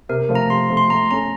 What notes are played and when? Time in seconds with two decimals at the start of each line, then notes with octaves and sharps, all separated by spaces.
0.09 C3 A#4
0.29 F3 A3
0.35 A#5
0.50 C3 C6
0.70 F3 A3
0.77 C6
0.90 A3 A#5
1.11 C#4 A4 A#5